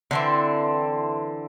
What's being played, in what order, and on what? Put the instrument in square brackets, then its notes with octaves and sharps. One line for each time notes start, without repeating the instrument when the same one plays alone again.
[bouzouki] D3 E3 C4